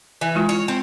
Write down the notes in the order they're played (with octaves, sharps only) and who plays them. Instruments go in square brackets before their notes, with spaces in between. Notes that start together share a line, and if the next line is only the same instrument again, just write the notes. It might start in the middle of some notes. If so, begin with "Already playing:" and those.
[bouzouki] E3
[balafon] G#3 E4 F4
[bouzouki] C#5
C4